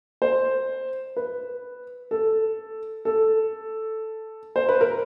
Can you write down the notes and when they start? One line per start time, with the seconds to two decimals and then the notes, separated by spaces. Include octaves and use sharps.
0.22 C5
1.17 B4
2.11 A4
3.05 A4
4.56 C5
4.69 B4
4.81 A#4